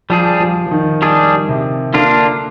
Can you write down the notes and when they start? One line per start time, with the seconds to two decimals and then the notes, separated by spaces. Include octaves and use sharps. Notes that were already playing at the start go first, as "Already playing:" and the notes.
0.10 F3 G3 D4 G#4
0.40 F3
0.67 F3
0.71 D#3
1.02 G3 D4 G#4
1.49 C3
1.94 D3 A#3 D4 F4